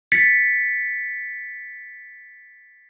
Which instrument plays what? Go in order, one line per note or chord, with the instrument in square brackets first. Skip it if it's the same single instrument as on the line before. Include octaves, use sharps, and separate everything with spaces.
[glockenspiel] A6 B6 C#7